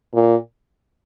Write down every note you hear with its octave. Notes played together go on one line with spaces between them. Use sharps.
A#2